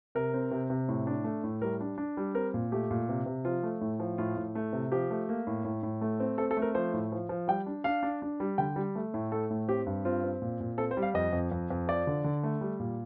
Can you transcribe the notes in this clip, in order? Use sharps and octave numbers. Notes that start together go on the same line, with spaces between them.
C3 A#4
C4
C3
C3
A2
D4
A3
A2
G3 A#4
D4
D4
G3
C4 A#4
A#2
A3 G4
A#2
C3
C3
F3 F4
A3
A2
F3
A2 F4
A2
A3
C3
F3 G4
A3
A#3
A2
A2
A2
A3
C4
C4 A4
A4
A3
A#4
F3 C5
A2
F3
F3
G3 G5
D4
D4 F5
D4
D4
G3
D3 G5
G3
A3
A2
A3 A4
A2
C4 G4
G2
C4 F4
C4
A#2
A#2
C4 A4
C5
G3
F5
F2 D#5
F2
F2
F2
F3 D5
D3
D3
A3
G3
A#2